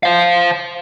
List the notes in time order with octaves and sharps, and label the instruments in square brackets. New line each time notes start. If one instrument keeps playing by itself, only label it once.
[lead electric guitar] C5 F5